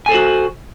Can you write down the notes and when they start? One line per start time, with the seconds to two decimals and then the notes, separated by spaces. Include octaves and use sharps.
0.06 G#5
0.09 A4
0.12 C5
0.14 F#4